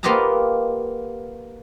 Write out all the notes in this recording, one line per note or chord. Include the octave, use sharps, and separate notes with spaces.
A#3 B3 F4 G4 D#5 A#5